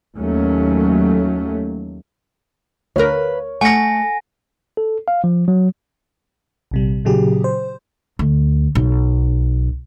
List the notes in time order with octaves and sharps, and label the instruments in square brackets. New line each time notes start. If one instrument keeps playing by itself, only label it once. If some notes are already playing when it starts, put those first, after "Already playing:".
[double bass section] D#2 F#3 A3 C#4
[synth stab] D2 A#4 [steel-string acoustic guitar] B4 F5 [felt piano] C#5
[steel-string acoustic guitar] A3 [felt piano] F#5 C#7 [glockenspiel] G#5 A#6 [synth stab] C#6
[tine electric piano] A4
F5
F3
F#3
[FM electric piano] A#1 C3 G3
A#2 C#3 F#3 G4 G#4
C5
[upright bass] D2
B1